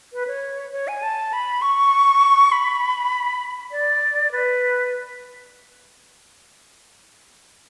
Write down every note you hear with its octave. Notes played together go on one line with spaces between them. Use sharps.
B4
C#5
C#5
G#5
A5
B5
C#6
B5
D5
B4